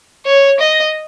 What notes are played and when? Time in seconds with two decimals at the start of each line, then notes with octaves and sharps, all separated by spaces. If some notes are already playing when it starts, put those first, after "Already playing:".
0.25 C#5
0.59 D#5